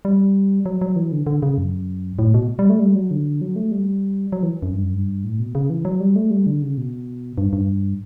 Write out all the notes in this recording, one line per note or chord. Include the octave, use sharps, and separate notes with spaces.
G3
F#3
F#3
E3
D3
D3
C#3
F#2
A2
B2
G3
A3
G3
F#3
D3
F#3
A3
G3
F#3
E3
F#2
G2
F#2
G2
A2
B2
C#3
E3
F#3
G3
A3
G3
D3
C#3
B2
G2
G2